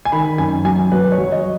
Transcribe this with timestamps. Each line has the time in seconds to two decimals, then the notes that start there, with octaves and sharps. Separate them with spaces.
0.05 G#5
0.12 D#3 B5
0.38 F#2 G#5
0.65 F#3 G#5
0.92 F#3 B4
1.12 C#5
1.18 F#3
1.32 D#5